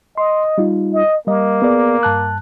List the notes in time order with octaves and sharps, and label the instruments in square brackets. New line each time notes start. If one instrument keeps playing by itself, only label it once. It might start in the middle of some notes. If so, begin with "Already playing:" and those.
[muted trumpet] D#5 [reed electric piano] C6
[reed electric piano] G3 D#4 F4
[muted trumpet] D#5
[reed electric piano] G3 D#5 [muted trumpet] A#3
[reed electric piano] B3 G#4 D5
G2 A5 F#6